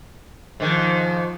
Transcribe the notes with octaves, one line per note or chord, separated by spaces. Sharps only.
G#2 D#3 F3